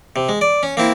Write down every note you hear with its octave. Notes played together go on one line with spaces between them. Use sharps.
C3
G#3
D5
C#4
A#3 C4 E4